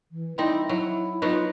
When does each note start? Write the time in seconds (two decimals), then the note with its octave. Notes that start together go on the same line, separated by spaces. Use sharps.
0.12 E3
0.38 G3 C4 D#4 E4
0.69 F#3 E4
1.22 F#3 B3 D#4 F4